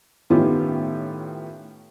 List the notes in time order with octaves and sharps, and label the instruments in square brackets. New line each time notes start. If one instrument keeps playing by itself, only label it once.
[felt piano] A2 D#3 B3 C#4 F4 G4